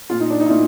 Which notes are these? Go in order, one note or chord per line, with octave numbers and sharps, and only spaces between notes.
A#2 F4
D#4
D4
D#4
E4
A#2 D#4